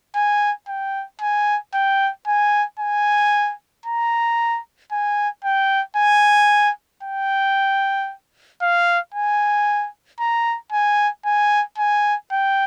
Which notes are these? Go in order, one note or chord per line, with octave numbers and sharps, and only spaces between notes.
G#5
G5
G#5
G5
G#5
G#5
A#5
G#5
G5
G#5
G5
F5
G#5
A#5
G#5
G#5
G#5
G5